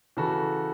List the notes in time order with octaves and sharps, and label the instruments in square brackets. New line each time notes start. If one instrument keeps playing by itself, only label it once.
[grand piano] C#3 E3 F#4 A4